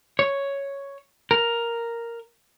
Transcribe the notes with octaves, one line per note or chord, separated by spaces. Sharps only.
C#5
A#4